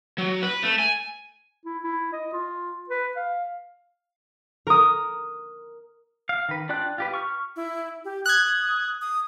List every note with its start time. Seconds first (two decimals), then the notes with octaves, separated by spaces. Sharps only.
0.18 F#3
0.43 B4
0.63 A3
0.79 G#5
1.65 E4
1.84 E4
2.13 D#5
2.33 F4
2.90 B4
3.16 F5
4.67 A#4 D#6
6.29 F5
6.49 D#3 B4
6.69 D4 F4 D5 G5 F#6
6.98 F4 G4 B4
7.14 C#6 F6
7.56 E4
8.05 G4
8.26 D#6 F#6 G#6
9.01 D#6